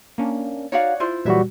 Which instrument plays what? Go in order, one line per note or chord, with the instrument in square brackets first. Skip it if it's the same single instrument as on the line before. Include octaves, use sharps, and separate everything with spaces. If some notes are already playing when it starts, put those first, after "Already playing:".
[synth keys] A#3 C#4 D4
[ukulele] D#4 F#4 F5 [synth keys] C#5 D5 F#5
[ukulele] E4 F4 C5
[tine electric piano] A#2 G3 F#4 [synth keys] E3 F#3 E5